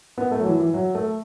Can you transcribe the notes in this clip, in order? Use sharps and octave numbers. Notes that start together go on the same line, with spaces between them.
B3
A3
F#3
E3
E3
F#3
A3